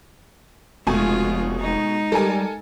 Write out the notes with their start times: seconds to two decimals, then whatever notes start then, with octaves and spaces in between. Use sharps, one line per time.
0.87 F1 B2 G#3 A3 F4 G#5
1.57 G#3 D#4
2.12 G3 A4 A#4 G#5